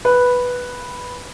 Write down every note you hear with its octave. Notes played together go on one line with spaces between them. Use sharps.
B4